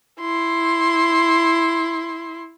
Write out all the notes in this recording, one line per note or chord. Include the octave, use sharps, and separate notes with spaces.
E4 C6